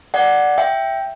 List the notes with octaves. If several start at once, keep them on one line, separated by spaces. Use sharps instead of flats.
D5 F#5
E5 G5